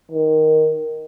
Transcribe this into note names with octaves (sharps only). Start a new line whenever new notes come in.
D#3